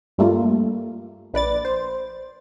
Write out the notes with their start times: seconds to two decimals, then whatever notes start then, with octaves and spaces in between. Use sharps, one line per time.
0.18 G2 G3 A3 A#3 F4
1.34 A#1 B4 D5 A6
1.65 C5